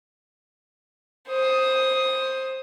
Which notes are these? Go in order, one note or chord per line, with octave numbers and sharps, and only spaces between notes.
C5 D#6